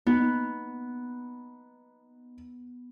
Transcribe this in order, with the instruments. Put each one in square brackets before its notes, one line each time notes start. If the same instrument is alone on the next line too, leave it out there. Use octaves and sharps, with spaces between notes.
[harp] B3 [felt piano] D#4